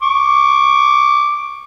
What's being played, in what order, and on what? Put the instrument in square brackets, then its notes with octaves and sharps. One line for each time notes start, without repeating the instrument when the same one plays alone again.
[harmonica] C#6 D6